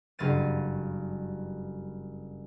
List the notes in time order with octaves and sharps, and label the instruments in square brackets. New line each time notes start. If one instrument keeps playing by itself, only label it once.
[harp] F#1 G2 F5 A6 D#7